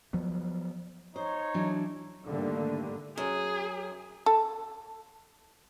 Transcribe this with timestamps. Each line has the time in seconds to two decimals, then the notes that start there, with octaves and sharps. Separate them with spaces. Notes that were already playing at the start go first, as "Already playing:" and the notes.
0.13 F3 F#3 B3
1.16 D#4 C5 C#5
1.54 E3 F#3 D4
2.27 G#2 D3 D#3 G3 A3 A#3
3.18 F#2 G#4
4.26 A4